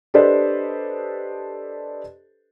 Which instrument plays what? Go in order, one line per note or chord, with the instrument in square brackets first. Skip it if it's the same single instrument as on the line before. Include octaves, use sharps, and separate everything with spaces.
[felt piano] D4 G4 A4 B4 C5 D#5